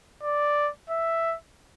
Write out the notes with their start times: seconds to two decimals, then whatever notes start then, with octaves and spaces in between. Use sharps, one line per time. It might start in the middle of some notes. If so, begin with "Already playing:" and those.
0.23 D5
0.90 E5